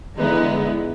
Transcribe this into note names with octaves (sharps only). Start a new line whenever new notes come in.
D3 F3 G#3 B3 D#4 E4